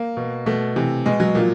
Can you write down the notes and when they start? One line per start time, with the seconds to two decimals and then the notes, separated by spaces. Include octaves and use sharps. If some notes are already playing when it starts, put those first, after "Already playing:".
Already playing: A#3
0.17 B2
0.46 B2 A3
0.76 C3 E3
1.06 B2 G#3
1.20 F#3
1.35 A#2 F3